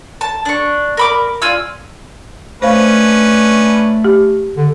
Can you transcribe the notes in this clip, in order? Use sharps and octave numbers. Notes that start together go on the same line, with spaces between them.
A5
D4 C#6
A#4 B5 D6
F4 D5 G#5 E6
A3 C#4 D4 B4 C5 F5
G4
D3